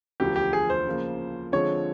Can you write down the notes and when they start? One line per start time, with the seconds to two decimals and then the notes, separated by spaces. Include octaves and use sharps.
0.20 E1 D2 D3 F3 G4
0.36 G4
0.53 G#4
0.70 C5
0.86 C#3 F3 A#3
1.52 D3 F3 G#3 C4 C#5